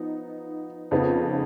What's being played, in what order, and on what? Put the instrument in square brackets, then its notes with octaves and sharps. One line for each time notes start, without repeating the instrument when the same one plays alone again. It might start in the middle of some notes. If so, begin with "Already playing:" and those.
Already playing: [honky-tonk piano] F3 B3 D#4
F2 C#3 F3 B3 D#4